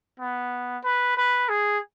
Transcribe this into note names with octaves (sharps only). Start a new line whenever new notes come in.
B3
B4
B4
G#4